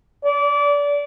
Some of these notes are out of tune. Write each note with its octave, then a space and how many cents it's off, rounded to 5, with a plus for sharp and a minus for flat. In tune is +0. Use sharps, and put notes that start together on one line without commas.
D5 -25